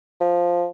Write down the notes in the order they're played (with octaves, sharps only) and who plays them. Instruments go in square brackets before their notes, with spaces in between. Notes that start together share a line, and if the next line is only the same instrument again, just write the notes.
[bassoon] F3